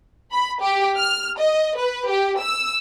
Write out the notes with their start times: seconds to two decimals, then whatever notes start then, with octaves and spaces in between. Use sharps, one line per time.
0.32 B5
0.61 G4
0.97 F6
1.37 D#5
1.77 B4
2.09 G4
2.40 E6